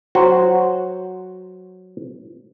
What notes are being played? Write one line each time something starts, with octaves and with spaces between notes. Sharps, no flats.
F#3 F#4 C5